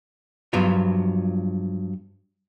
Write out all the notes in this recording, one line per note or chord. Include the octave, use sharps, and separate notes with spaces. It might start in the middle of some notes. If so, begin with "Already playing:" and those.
G2 F3 F#3 B3 F4